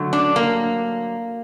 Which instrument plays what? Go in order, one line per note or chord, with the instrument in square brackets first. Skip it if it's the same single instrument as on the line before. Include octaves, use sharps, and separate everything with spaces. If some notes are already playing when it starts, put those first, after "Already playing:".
Already playing: [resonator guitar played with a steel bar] D3 F#3 A3
D4
A#3